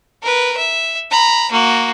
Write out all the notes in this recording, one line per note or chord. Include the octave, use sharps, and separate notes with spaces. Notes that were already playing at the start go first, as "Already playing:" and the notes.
A#4 B4
E5
A#5 B5
A#3 F#4